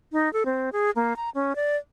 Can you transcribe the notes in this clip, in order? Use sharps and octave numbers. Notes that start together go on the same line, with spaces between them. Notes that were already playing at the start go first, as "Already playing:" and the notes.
D#4
A4
C4
G#4
A#3
A#5
C#4
D5